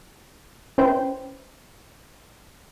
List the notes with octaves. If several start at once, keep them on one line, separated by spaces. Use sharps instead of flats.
C#4 E4 B4 C5 G5